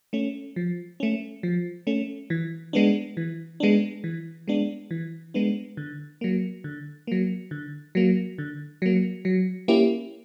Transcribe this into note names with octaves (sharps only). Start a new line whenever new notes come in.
A3 C#4
F3
A3 C#4
F3
A3 C#4
E3
G#3 B3 D4
E3
G#3 B3 D4
E3
G#3 B3 D4
E3
G#3 B3 D4
D3
F#3 A#3
D3
F#3 A#3
D3
F#3 A#3
D3
F#3 A#3
F#3
A#3 C#4 E4 G4